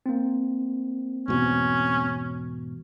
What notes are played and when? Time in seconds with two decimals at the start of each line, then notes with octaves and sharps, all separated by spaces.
0.06 A#3 C4
1.28 E2 G#2 B2 C#4